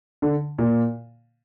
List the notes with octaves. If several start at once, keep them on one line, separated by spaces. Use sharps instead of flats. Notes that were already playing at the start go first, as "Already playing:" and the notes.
D3
A#2